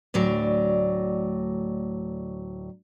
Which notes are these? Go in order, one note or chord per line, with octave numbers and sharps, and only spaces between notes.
D2 A2 F#3 D5